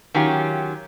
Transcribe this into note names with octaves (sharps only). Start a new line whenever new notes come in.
D#3 F#3 C#4 F4 G4